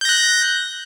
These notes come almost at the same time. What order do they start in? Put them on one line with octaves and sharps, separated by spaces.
G6 A#6 F#6